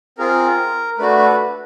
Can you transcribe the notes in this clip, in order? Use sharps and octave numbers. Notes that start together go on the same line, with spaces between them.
C4 F4 G#4 A#4
A3 D4 F#4 B4
B4